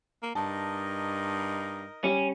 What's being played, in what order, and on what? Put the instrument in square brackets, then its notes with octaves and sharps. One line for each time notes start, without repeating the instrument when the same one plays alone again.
[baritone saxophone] A#3
[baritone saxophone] G2 [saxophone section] D#4 A#4 D#5 [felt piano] A5
[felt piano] G3 [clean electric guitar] C#4